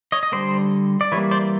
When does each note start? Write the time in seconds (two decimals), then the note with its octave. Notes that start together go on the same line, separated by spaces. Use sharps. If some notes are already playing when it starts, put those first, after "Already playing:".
0.12 C#5 D#5
0.23 D#5
0.32 D3 G3 A#3 C5 D5
1.01 D5
1.12 E3 G3 A#3 B4 C#5
1.31 C5 D5